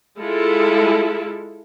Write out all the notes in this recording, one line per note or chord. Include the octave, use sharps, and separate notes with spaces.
G#3 E4 F4 A4